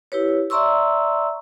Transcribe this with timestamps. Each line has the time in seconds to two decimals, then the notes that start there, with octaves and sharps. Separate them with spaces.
0.12 E4 G4 B4 C#5
0.50 D5 E5 A#5 C6 C#6 E6